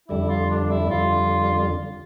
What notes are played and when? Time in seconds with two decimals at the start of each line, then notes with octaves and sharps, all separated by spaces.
0.09 F2 D3 G3 E4
0.29 F4
0.50 D4
0.70 E4
0.90 F2 D3 G3 F4